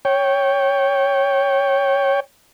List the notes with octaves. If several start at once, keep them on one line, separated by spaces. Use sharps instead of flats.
C#5 G5